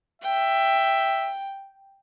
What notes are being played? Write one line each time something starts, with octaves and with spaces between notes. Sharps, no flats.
E5 G5